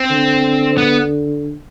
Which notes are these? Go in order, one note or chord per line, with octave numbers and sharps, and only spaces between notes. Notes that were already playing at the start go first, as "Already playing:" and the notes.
Already playing: C4
D3
B3